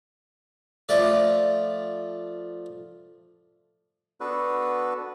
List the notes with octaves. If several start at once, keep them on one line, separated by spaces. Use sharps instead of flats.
F3 A3 D5
B3 D4 F#4 A4 B4